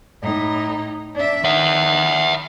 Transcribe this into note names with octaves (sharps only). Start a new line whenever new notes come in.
A2 D#4
D4 E5
D#3 E5 F#5